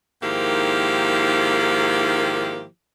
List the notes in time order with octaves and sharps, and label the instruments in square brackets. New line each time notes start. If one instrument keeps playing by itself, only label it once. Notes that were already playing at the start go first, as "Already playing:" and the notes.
[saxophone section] G#2 D#3 F3 A#3 E4 G4